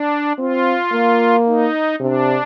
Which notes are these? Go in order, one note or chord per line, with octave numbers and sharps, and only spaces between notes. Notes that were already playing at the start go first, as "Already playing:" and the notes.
Already playing: D4
C4 F4
A#3
D#4
C3 D4